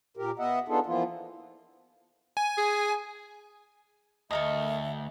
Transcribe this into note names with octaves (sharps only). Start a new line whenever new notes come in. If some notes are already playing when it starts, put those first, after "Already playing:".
A#2 G4 A#4
B3 D#5 E5 F#5
B3 D4 D#4 F4 G#4 A4
E3 F3 A#3 B3 F4
G#5
G#4
D2 A4 A#4 D#5 E5